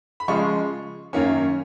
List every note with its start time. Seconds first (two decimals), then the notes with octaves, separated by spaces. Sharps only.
0.20 B5
0.28 C#3 F3 G#3 C#6
1.13 F#2 D#3 A#3 C#4